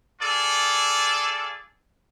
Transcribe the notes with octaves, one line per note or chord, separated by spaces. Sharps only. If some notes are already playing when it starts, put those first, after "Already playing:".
F4 G#4 A4 D5